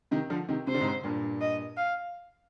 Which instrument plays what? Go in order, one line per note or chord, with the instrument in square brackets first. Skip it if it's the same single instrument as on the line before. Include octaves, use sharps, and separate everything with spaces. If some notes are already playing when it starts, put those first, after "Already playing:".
[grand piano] C3 D#3
D3 F3
C3 D#3
[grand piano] C3 [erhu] C5
[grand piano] D3
G#2 C3
G2 A#2
[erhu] D#5
F5